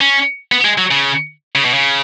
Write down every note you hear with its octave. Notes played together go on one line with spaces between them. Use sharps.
C#4
B3
G#3
F#3
C#3
C#3
B2
C#3